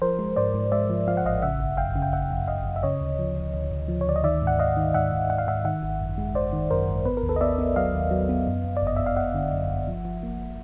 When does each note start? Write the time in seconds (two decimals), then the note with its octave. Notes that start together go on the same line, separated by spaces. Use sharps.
0.02 F3 A#4 C5
0.19 G#3
0.36 G#2 C5 D5
0.54 G#2
0.72 G#3 D5 E5
0.90 F3
1.08 F3 F5
1.17 F#5
1.25 A1 D#5 F5
1.42 C#3 E5 F#5
1.60 G1
1.77 F#2 F5 G5
1.96 C#3
2.02 G5
2.13 G1 E5 F#5
2.30 F#2
2.48 G1 D#5 F5
2.65 F#2
2.76 E5
2.83 C#3 C#5 D#5
3.01 D2
3.19 F3
3.36 D2
3.54 D2
3.71 D2
3.88 F3
4.01 C#5
4.07 D2 D5
4.16 D#5
4.24 D#3 D5 E5
4.42 G#2
4.47 F#5
4.59 G#2 D#5 F5
4.77 D#3
4.94 G#2 E5 F#5
5.12 G#2
5.30 G#2 F#5
5.38 F5
5.47 G#2 E5 F#5
5.65 D#3 E5 F#5
5.83 G#1
6.01 F#2
6.18 G#3
6.35 G#1 C5 D5
6.53 D#3
6.71 F#2 A#4 C5
6.89 G#1
7.05 B3 B4
7.17 A#4
7.23 D#2
7.29 A4 B4
7.36 D#5
7.41 B3 D5 E5
7.58 B3
7.76 F#3 D#5 F5
7.94 D#2
8.11 F#3
8.29 B3
8.47 F#2
8.64 F#2
8.77 D5
8.82 G1
8.87 D#5
8.97 G1 E5
9.06 F5
9.16 G1 E5 F#5
9.34 D3
9.52 F#2
9.69 G1
9.88 F3
10.05 F3
10.23 A#3